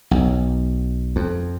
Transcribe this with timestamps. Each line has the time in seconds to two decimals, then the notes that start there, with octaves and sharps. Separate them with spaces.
0.11 B1
1.16 F2